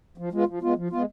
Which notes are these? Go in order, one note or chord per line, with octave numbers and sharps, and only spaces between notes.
F3
G#3 B3 F4
F3
G#3 B3 F4
F3
G#3 B3 F4